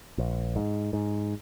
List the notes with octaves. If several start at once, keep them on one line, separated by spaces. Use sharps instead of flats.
A#1
G#2
G#2